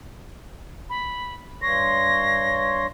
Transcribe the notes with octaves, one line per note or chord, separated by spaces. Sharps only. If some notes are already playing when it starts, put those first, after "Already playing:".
B5
G2 C#5 C6 A#6